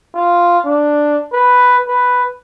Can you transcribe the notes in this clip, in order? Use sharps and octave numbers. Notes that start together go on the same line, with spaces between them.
F4
D4
B4
B4